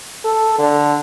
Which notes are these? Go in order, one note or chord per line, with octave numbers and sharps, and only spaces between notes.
A4
D3